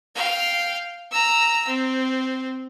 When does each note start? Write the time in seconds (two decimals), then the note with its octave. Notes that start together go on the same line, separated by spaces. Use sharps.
0.15 F5 G5
1.11 A#5 E6
1.68 C4